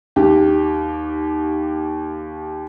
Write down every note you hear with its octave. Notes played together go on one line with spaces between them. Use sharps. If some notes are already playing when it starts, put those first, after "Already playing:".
D#2 G4